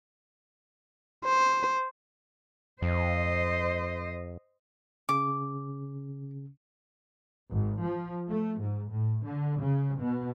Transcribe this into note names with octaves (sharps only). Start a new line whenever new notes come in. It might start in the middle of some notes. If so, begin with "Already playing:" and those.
C5
F2 C5 D#5
C#3 C#4 D6
G#1
F3
A3
G#2
A2
D3
C#3
B2